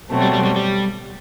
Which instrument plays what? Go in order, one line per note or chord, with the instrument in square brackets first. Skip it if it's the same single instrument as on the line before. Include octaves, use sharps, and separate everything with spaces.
[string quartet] B2 F#3 A3 C4
[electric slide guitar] G3
G3
G3
G3